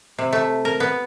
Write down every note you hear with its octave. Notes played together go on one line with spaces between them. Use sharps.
C3
A3
A#4
B3